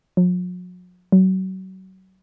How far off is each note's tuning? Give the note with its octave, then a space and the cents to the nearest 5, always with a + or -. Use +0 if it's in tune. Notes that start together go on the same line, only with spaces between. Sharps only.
F#3 -45
F#3 +30